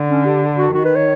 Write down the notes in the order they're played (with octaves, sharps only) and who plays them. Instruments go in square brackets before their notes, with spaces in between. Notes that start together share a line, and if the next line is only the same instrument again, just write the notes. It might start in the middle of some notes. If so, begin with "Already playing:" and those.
Already playing: [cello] D3
[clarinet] C#4
G4
F#4
[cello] D#3 [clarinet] F#4
[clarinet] B4
C#5